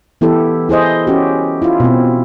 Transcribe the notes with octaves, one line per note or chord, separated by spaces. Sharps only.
E3 B3 E4 G4 A4
E4 G#4 C5 D#5
C#4 F#4 G4
E4 F4
B2 C4